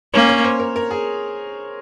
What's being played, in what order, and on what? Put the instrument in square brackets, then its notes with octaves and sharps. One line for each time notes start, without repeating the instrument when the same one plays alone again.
[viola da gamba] A#3 C#4 [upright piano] C#5
[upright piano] C#5
C5
A#4
A#4
G#4